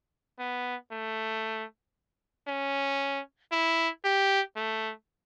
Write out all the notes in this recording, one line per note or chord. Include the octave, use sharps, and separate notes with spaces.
B3
A3
C#4
E4
G4
A3